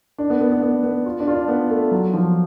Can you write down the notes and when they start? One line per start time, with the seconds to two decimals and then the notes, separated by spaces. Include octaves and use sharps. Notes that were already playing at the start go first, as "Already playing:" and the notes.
0.18 D4
0.30 B3
0.41 B3
0.52 B3
0.62 B3
0.83 B3
1.06 F4
1.20 D4
1.28 F4
1.35 D4
1.48 B3
1.70 A3
1.92 F#3
2.14 F3